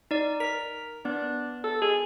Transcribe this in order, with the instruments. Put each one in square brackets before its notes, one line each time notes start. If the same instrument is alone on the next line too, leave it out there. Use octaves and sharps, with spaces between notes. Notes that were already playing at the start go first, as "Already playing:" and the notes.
[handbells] D#4 D5
[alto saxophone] A#4 [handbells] B6
[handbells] B3 [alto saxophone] D4
[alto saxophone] A4
G#4